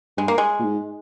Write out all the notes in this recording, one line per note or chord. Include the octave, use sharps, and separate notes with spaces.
G2 G#3
A#3
G#3
A#2
G#2